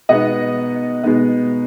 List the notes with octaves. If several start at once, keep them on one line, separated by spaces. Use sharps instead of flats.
B2 G#3 B3 D#4 D#5 F#5
B2 G#3 B3 D#4